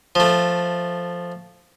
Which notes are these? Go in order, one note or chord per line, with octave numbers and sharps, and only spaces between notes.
F3 A3